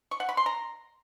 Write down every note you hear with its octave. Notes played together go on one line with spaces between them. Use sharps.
C#6
F#5
B5
C6
A#5